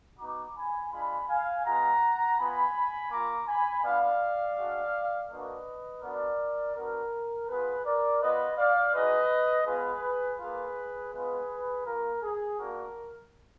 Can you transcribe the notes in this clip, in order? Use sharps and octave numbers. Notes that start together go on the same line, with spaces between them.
B3 D#4 F#4 A#5 D6
G#5 B5
G#3 D4 F4 G#5 B5
F5 G#5
G#3 B3 F4 F#5 A#5
B3 F4 G#5 B5
A#3 F4 A#5 D6
G#5 B5
B3 D4 F4 D5 F5
G#3 D4 F#4
A#3 D4 F#4 B4 D#5
B3 D4 F#4 A#4 D5
B3 D4 F#4 A#4
B3 F4 G#4 B4
A#4 D5
B3 F4 B4 D#5
D5 F5
G#3 D#4 F#4 B4 D#5
G#3 B3 F4 G#4 B4
A#3 F4 G#4 B4
G#3 B3 F4 G#4 B4
A#3 F4 A#4
G#4
A#3 D4 F#4 A#4